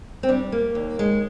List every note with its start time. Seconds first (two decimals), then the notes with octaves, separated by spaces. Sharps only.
0.23 C4
0.29 G3 D4
0.52 A#3
0.75 D#2
0.99 G#3